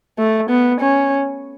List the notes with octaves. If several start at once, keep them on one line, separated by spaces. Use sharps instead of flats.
A3
B3
C#4